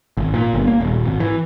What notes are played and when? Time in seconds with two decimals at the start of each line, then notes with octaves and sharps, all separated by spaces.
0.17 G#1
0.34 A#2
0.54 G1
0.68 A#3
0.81 D#1
1.07 G#1
1.20 E3